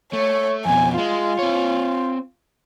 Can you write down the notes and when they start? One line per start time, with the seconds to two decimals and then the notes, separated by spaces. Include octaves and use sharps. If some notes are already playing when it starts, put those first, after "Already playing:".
0.13 A3 C#5
0.66 F2 B2 G#5
0.98 G#3 F4
1.39 C4 C#5